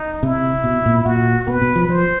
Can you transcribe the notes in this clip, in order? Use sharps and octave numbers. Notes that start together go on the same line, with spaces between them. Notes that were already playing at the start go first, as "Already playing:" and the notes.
Already playing: D#4
C3 E4
B2
A#2
A#2 F#4
B2 B4
B2
F3
F3 C5